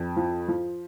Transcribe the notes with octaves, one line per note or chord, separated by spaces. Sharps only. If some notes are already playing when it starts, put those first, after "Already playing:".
Already playing: F2
F3
F3